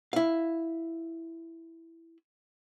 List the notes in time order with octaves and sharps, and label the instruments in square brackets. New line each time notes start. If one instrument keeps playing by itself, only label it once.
[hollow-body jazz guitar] E4 F5